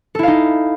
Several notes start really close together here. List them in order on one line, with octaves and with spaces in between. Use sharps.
A4 E4 F5 D#4